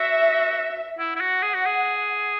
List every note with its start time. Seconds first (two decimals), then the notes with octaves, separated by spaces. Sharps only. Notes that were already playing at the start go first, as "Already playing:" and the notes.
Already playing: F#4 E5
0.99 E4 F#5
1.16 E4
1.21 F#4
1.43 G#4
1.54 F#4
1.66 G#4